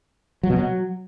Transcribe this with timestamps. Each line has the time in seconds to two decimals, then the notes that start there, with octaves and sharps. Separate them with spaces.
0.43 F#3
0.50 B2
0.56 F#3